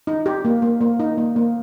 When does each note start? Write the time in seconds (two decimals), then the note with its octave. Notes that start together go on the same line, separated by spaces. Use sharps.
0.07 D#4
0.26 G4
0.45 A#3
0.62 A#3
0.81 A#3
1.00 D#4
1.18 A#3
1.36 A#3